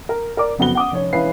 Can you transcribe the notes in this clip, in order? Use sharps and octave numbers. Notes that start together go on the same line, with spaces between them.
A#4
A#4 D5 D6
F#1 F2 B3 F#4 G7
F#5 D6 D#6
F1 C#4 C#5
E1 E3 C#4 B4 F5 C7